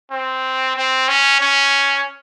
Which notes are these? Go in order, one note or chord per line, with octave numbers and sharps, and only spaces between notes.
C4
C4
C#4
C#4